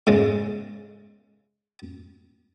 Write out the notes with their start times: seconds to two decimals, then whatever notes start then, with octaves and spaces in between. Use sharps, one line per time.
0.07 G#2 C#3 G#3